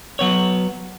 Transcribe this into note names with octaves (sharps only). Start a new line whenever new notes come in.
F#3 B3 C#5